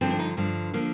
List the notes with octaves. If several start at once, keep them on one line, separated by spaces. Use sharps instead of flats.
G2 D3 F3 C4
D4
D#4
G2 D3 F3
D3 F3 A#3